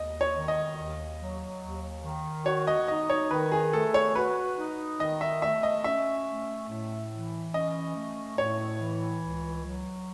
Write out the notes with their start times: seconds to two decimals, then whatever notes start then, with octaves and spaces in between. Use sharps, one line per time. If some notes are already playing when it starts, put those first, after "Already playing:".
Already playing: D#2 D#5
0.21 C#5
0.34 D#3
0.48 D#5
0.77 D#2
1.19 F#3
1.61 D#2
2.04 D#3
2.46 F#4 C#5
2.67 D#5
2.88 D#4 D#5
3.10 C#5
3.31 D#3 B4
3.52 G#4
3.73 A3 A4
3.94 C#5
4.15 F#4 B4
4.58 D#4
5.00 D#3 D#5
5.21 E5
5.42 A3 E5
5.63 D#5
5.84 C#4 E5
6.27 A3
6.69 A2
7.12 E3
7.54 C#4 D#5
7.96 A3
8.38 A2 C#5
8.81 E3
9.23 C#2
9.65 F#3